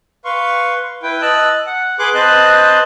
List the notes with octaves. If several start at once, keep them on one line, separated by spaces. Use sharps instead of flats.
B4 F5 C6 C#6
E4 B4 G5
D#5 A5 E6 F#6
F#5
G#4 B4 C6 D6 F#6
C4 B4 D#5 A5 C6 F#6